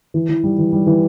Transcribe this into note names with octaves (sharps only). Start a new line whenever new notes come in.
E3
E3
G3
E3
G3
E3